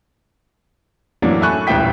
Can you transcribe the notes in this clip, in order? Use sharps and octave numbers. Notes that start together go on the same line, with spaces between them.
F#2 A2 E3 F#3 A#3 D4
A4 E5 G#5 B5 C#6 F#6
D#1 A1 D2 E5 G5 B6